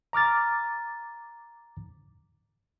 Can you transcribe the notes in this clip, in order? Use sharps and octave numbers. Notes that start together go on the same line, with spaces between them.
A#5 D6 F6 A6